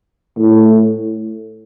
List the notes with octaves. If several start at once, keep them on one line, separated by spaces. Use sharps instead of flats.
A2